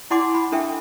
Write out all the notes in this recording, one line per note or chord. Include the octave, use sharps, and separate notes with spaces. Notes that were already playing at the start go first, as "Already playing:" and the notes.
E4 D5 F#5 G#5 C6 D6
B5
D4 A4 E5 G5